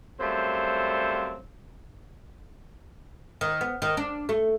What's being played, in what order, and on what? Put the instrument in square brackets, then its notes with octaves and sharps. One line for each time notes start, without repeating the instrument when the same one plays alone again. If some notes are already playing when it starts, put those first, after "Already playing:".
[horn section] F#2 G3 A3 C4 C5 F5
[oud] D#3
B3
D#3
D4
A3